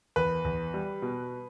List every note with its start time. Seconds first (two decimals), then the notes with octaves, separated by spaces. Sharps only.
0.16 E2 B4
0.45 E2
0.74 G3
1.02 B2